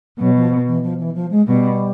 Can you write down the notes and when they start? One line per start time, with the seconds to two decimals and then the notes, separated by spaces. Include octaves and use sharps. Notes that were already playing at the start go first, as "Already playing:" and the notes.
0.19 B2 F#3
0.36 F3
0.67 E3
0.83 F3
0.99 E3
1.15 F3
1.31 G#3
1.47 B2 G3